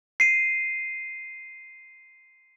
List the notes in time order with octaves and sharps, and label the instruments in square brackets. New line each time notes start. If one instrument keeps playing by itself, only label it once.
[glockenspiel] C7 D#7